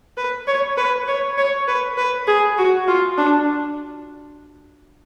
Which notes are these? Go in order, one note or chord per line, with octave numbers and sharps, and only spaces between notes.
B4
C#5
B4
C#5
C#5
B4
B4
G#4
F#4
F4
D4